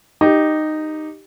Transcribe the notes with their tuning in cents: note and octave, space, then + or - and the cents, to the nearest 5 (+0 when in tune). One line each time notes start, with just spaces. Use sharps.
D#4 -10 G4 +0